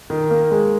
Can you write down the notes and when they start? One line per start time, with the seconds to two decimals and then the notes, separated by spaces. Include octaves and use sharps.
0.10 D#3
0.30 A#3
0.51 G#3